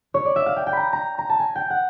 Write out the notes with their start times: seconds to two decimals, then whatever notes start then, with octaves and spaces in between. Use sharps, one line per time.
0.14 C#5
0.25 D5
0.36 E5
0.46 F5
0.56 G5
0.67 G5
0.73 A#5 B5
0.93 A#5
1.18 A#5
1.29 A5
1.39 G#5
1.55 G5
1.70 F#5